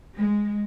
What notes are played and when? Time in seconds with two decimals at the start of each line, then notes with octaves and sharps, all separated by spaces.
0.16 G#3